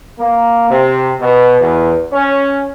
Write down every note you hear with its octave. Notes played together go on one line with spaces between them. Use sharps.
A#3
C3
B2
E2
C#4